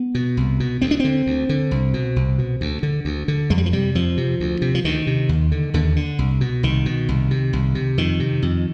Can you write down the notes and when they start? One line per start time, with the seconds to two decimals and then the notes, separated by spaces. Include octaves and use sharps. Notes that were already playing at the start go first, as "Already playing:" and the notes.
Already playing: B3
0.15 B2
0.37 C2
0.60 B2
0.82 D2 C4
0.91 D4
1.00 D3 C4
1.26 D2
1.49 D3
1.71 C2
1.94 B2
2.16 C2
2.38 B2
2.61 D2
2.83 D3
3.05 D2
3.28 D3
3.50 F2 G#3
3.58 G3
3.66 F3
3.73 C3 G3
3.95 F2 F3
4.17 C3
4.40 D2
4.62 C3
4.75 F3
4.84 D2 D#3
5.07 C3
5.29 D#2
5.52 D3
5.74 D#2 D3
5.96 D3
6.19 C2
6.41 B2
6.63 C2 D#3
6.86 B2
7.09 C2
7.31 C3
7.53 C2
7.75 C3
7.98 F2 D#3
8.20 C3
8.42 F2